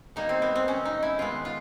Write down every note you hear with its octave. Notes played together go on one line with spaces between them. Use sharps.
B2 G3 A#3 D#4
C4
B3
C4
C#4
D#4
E4
D#3 G#3 B3 F4
F4